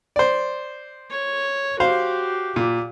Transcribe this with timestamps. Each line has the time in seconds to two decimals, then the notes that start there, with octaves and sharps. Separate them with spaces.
0.16 C5 D5
1.11 C#5
1.80 F#4 G4 C5 F5
2.56 A#2